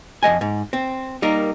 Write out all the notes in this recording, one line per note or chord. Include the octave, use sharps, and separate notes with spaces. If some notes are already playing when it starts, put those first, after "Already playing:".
F2 F3 D#5 G#5
G#2
C4
G3 A#3 D#4 A#4